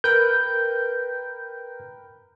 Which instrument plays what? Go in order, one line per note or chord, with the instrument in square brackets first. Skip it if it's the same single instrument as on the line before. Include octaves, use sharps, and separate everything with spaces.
[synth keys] A#4 B4 G5 [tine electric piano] G6